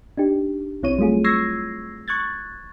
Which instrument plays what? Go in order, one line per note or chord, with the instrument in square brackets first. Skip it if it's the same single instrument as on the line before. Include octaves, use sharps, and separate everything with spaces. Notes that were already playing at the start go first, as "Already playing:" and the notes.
[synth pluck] D4 D#4 G4
B1 C4 E4 C#5 D#7
F#3 G3 A3 F4 G#4
C#6 E6 G#6 A#6 C7
C#6 F#6 G#6 A6